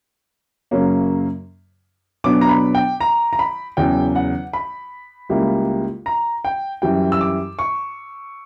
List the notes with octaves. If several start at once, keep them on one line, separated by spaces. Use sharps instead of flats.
F#2 C#3 F#3 A#3 C#4
B2 F#3 B3 D4 D6
A#5
B5
G5
A#5
A#5
B5
E2 C#3 F#3 G5
F#5
B5
C#2 C#3 G3 A#3 E4
A#5
G5
F#2 E3 G3 G5
E6
D6
C#6